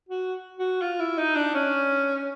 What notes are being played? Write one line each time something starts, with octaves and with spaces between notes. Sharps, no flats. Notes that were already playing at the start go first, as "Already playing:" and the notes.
F#4
F#4
F4
E4
D#4
D4
C#4